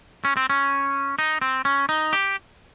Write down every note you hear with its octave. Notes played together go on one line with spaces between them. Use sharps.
C#4
C4
C#4
D#4
C4
C#4
D#4
G4